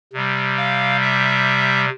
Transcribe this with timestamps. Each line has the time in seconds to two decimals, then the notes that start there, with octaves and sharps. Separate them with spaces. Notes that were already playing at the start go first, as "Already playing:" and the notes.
0.13 C3 G3
0.57 F5
1.02 E5